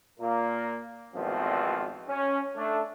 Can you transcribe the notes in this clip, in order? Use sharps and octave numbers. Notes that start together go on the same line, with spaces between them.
A#2 A#3
G#1 E2 B2 F3 A3 C4
C#4
A3 D4